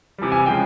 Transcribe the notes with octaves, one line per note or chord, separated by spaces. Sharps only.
C3 E3 G3
G#5
C#3 F3 G#3 G5